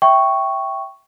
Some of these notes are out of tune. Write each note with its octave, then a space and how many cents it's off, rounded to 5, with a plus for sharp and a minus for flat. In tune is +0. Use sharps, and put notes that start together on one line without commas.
E5 +0 G5 -5 C#6 +0